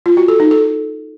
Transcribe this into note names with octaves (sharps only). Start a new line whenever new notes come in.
F4
F#4
A4
D#4
A4